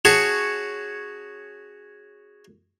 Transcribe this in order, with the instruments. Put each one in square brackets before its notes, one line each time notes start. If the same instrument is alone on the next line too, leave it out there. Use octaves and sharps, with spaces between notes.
[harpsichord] C#4 F#4 G#4 A5 C#6